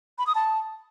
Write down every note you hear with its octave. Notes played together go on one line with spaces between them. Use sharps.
B5
D#6
A5